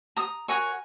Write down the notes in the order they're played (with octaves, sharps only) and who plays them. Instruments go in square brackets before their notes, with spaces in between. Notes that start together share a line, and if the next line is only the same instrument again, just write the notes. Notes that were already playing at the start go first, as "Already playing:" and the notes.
[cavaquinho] A#5 D#6
F#4 A#4 C#5 G#5 C#6